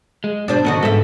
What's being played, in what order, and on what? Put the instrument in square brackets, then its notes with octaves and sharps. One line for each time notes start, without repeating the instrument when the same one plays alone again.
[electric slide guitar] G#3
[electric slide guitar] B2 [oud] D4 C5 D5
[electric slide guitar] F2 B2 D3 [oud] D#3 F#4 D#5
[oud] G#2 E5 [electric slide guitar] D3 A4 B4